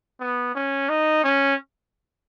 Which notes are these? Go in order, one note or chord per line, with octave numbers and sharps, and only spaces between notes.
B3
C#4
D#4
C#4